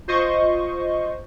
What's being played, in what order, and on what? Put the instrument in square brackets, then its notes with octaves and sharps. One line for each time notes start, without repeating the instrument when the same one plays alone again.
[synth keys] F4 C5 D#5 C#6